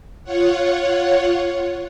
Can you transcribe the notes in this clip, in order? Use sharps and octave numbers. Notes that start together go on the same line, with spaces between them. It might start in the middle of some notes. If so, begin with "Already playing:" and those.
F4 C#5 F#5